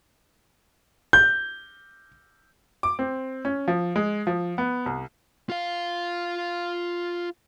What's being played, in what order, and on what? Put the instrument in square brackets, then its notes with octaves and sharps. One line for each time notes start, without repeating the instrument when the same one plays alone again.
[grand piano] G6
[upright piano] D6
C4
C#4
F3
G#3
F3
B3
C2
[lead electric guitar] F4 F5